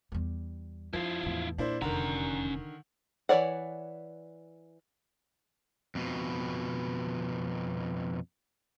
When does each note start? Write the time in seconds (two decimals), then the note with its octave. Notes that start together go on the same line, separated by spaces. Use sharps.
0.12 E2 G3
0.93 F2 F3 E4 F4
1.23 E2 A2
1.58 A#2 D4 E4 C5
1.81 F1 E2 D3 D#3 C#4 A#5
3.29 E3 G#4 C#5 D5 F#5
5.95 F2 B2